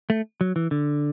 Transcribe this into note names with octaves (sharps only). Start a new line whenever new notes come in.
A3
F#3
E3
D3